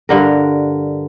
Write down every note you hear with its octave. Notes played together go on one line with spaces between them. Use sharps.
G2 D3 A#4